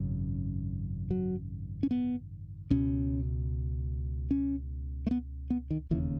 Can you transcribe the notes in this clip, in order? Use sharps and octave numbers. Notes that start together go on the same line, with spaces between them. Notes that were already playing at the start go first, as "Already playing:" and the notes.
Already playing: G#1 F#2 C#3
F#3
C#4
B3
C#2 B2 C#4
C#4
A3
B3
B3
D#3
E1 D#2 C#3 E3